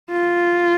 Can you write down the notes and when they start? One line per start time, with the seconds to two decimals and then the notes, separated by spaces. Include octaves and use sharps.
0.12 F4